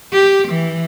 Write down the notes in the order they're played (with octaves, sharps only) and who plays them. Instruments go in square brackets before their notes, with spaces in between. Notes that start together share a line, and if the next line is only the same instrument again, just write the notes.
[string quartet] G4
E3